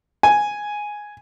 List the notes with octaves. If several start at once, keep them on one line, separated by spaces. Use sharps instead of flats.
G#5